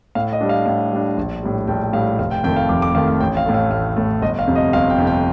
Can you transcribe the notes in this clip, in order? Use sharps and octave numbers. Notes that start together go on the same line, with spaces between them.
A2 F5
D#5
G3 D4
F5
A2 F5
G3 D4
A#1
A2 G3
A#1 G5
A2 G3 F5
F1 F5
G5
F2 D#3 A3 G5
F5
F1 D6
D6
F2 D#3 A3 F5
F5
A1 G5
F5
A2 A3
F5
A1 F5
A2 A3
G1 D#5
F5
F2 C3
D#5
G1 F5
G5
F2 C3
G5